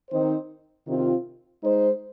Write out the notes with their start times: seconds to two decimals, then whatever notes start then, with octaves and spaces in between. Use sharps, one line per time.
0.11 D#3 C4 D#4 C5
0.86 C3 D#3 C4 F4
1.63 G#3 D#4 C5